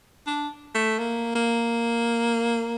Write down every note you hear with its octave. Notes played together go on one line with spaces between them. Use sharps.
D4
A3
A#3
A#3